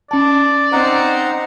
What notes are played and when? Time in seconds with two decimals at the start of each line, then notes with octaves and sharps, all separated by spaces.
0.11 C#4 D5 A5
0.73 C4 D#4 F#5 A#5